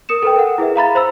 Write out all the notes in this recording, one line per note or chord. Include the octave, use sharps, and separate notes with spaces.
A#4 D#6 C#7 E7
A4 B4 G5
A#4 F#5
E4 G#4 B4 E5
F5 A#5 B5 A6
C5 B5 E6